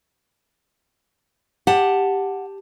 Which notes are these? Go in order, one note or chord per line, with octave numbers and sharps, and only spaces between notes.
G4 F#5 A5